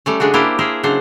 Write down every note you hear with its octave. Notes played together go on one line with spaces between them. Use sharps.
G3 A3 C#4
C#3 G#3 D4 F#4
A#3 D4 E4 G4 C5
G#4 A#4 C5 E5
C#3 F#3 D4 C5